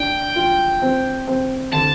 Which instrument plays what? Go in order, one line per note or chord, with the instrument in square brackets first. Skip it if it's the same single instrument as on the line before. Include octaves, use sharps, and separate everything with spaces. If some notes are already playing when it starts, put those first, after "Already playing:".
Already playing: [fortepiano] D4 [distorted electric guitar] G5
[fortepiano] F4
C4
C4
[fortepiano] D3 [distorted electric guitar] A5